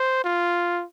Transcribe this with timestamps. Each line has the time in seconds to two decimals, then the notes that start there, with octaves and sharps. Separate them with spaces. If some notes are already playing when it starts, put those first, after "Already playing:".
Already playing: C5
0.25 F4